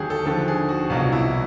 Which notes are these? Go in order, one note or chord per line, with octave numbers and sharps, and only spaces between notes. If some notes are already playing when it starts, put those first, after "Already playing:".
Already playing: D#2 D3 F#3 G4 G#4
A4
D#2 D3 F3 A4
G#4
F#4
C2 B2 F#3 F4
E4